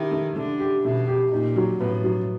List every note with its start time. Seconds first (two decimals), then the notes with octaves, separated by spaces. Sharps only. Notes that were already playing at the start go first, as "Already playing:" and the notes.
Already playing: D#3 E4 G4
0.11 A3
0.36 D3 A3
0.60 G4
0.84 B2 A3
1.07 G4
1.32 A#2 D#4
1.56 F#3
1.80 A2 B3
2.04 F#3